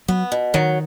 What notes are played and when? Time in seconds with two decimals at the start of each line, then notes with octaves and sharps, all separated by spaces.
0.08 F#3 B3
0.32 B2
0.54 D#3 F#3